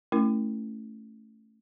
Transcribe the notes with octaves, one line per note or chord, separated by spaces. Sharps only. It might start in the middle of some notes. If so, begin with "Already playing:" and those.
A3 C#4 E4 A#4